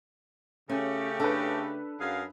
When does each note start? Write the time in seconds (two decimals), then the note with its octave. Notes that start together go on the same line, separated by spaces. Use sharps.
0.69 C#3 A3 C#4 G4
1.20 D4 A4 B4
1.99 F#2 G#4 F5